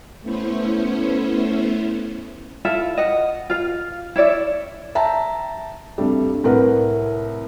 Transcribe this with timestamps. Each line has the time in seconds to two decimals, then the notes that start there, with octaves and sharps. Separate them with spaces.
0.22 A3 B3 C#4 E4 C5 C#5
2.65 E4 F4 A4 E5
2.97 D#5 F#5
3.50 F4 F5
4.16 E4 C#5 D5 E5
4.95 E5 G5 A5 A#5
5.98 G2 C3 G3 A3
6.44 C2 A2 A#4 B4 F#5